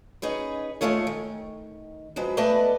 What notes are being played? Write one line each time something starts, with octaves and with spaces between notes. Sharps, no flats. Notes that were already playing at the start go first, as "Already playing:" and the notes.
C#4 D#4 G#4 B4
D#2 D#3 G#3 A3 F4 C#5
D#3
F3 F#3 G#3 B4
A3 B3 B4 D5 D#5 A5